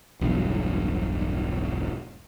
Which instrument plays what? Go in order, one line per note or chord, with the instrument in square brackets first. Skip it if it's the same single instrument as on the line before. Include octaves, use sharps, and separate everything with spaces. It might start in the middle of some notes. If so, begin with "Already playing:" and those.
[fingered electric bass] E1 B1 G2